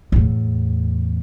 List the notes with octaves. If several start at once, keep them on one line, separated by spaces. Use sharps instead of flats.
E2 A2